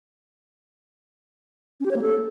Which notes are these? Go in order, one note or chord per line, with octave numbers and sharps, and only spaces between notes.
C#4
G4
C#5
A#3
A4